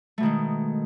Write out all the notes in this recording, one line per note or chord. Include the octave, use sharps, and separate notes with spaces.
B2 D#3 G#3 A3